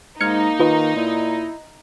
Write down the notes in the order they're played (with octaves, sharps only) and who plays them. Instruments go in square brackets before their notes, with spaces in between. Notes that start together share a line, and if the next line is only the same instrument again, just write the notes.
[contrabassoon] G#2 [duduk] A#3 [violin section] D#4 [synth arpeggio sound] F6 G#6 C#7
[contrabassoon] D#3 [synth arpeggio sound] F4 B4 D#5
[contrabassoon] A#2 [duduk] E4